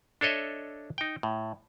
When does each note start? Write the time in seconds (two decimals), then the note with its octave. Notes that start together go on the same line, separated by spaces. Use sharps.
0.21 D4 A4 C#5 D#5 E5
0.98 D#4 G5
1.23 A2